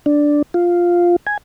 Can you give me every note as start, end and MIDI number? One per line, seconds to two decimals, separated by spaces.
0.06 0.42 62
0.54 1.16 65
1.27 1.37 80